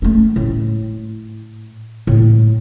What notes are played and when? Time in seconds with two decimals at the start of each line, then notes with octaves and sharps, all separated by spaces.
0.02 A3 C#4
0.36 A2
2.07 A2